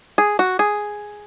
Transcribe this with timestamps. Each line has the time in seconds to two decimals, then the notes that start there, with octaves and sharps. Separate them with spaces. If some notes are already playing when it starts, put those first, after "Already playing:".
0.18 G#4
0.39 F#4
0.59 G#4